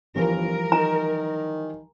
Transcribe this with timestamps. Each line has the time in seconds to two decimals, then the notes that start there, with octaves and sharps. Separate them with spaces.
0.15 G1 E3 F3 G3 A#4
0.72 D#3 A#5